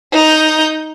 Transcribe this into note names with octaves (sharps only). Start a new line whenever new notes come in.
D#4 G6